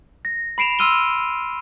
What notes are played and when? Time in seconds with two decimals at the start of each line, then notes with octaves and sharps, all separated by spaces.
0.25 A#6
0.58 B5 C7 D7 E7 F7
0.79 C6 E6 F6 D#7 G7